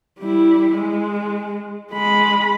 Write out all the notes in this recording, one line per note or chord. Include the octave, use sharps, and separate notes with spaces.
G3 E4
G#3
G#3 B5